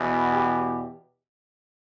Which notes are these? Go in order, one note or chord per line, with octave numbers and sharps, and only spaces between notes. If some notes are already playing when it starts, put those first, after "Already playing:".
Already playing: E2 B2
G4